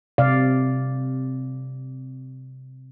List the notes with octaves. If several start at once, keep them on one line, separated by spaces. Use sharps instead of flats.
C3 D5 F5